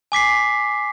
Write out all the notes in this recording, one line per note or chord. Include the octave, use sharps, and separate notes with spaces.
G#5 D6 B6 C7